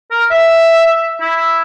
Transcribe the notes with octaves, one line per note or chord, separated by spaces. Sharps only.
A#4
E5
E4